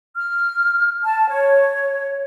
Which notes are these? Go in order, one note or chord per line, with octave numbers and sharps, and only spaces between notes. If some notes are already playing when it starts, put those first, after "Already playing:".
F6
A5
C#5